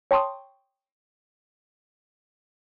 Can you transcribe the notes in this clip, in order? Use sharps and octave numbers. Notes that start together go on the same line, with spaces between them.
C#5 G5 A5 C6 C#6 D#6